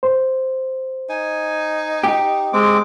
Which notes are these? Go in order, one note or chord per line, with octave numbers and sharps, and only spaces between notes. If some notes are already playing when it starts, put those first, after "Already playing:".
C5
D#4 G#5
G4
G#3 C4 D6